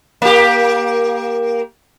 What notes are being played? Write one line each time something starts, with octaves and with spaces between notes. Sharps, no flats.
A#3 G4